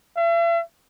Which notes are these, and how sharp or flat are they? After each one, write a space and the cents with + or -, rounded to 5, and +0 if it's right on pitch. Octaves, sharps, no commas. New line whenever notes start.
E5 +45